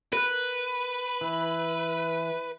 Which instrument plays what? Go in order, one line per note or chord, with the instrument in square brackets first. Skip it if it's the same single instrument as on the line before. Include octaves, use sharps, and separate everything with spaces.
[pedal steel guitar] A#4 F#6 [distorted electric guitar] B4
[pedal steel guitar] E3